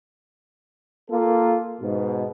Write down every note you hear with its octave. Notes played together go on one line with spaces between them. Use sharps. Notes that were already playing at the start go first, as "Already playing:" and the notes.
A#3 F4 A4
G#2 B2